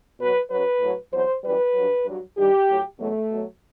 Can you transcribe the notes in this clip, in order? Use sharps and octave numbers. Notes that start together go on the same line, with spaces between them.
B2 F#3 B4
F#2 F#3 B4
A2 F#3
E2 B2 F#3 C5
F#2 E3 G3 B4
G2 F#3
G2 F#3
G2 D#3 G3 G4
A2 F#3
E2 B2 F#3 A3
B2 F#3